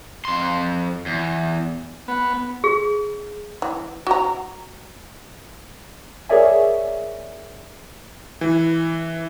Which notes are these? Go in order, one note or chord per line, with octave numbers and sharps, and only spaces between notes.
F2 C6
E2
B3
G#4
E3
F#4 A#5
G#4 A#4 C#5 D5 E5 G#5
E3